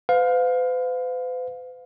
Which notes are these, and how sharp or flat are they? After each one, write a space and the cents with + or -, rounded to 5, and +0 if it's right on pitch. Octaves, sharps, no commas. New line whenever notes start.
B4 +45 F5 +20